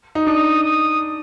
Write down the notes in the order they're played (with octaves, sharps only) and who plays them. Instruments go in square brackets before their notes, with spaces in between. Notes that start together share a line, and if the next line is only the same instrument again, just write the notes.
[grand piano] D#4
[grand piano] D4 [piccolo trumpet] D#6
[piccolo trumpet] D#6